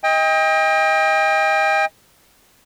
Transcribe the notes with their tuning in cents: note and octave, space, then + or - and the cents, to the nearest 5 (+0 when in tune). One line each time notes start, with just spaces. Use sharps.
D#5 +25 G5 +35